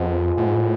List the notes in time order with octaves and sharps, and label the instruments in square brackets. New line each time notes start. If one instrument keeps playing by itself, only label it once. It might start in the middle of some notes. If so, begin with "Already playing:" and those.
Already playing: [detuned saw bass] F2 [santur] F3 G#3 B3
[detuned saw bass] A2 [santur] F3 G#3 B3
[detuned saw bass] G#2
A2